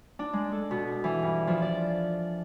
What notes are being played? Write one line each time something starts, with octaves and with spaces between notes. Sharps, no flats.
D4
G#3
A4
B2
E3
G2
F3
D5